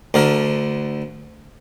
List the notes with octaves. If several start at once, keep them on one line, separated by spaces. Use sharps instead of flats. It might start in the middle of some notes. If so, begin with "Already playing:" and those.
D2 D3 A#4